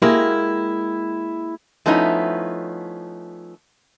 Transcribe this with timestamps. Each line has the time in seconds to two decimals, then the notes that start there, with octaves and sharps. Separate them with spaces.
0.02 G#3 A#3 E4 F#4 G4
1.86 F3 A3 B3 C#4 D#4 E4